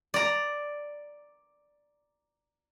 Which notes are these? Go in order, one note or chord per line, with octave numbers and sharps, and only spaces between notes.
D5 A#5